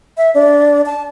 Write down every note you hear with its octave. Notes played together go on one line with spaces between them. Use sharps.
E5
D4
A5